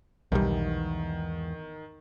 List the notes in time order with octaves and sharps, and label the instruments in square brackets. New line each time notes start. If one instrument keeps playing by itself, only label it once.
[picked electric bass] B1 G3 [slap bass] E2 G#2 E3 [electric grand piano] D#3